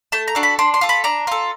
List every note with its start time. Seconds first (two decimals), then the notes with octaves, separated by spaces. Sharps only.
0.12 A3 A5
0.28 A#5
0.35 D4 F#4 A4
0.43 B5
0.59 D4 C6
0.74 C6
0.81 F4 A4
0.89 B5
1.04 D4 A#5
1.27 F4 A4